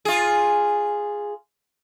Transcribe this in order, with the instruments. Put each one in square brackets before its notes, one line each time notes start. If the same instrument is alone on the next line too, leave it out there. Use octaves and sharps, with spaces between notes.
[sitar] F4 G#4